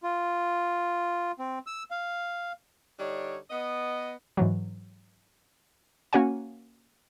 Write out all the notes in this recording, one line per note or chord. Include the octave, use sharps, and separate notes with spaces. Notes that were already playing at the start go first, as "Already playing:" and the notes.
F4
C4
E6
F5
D3 G3 D4 D#4 C#5
B3 D#5
G#2 E3 F#3
A#3 C#4 F#4 C#5 F#5 G#5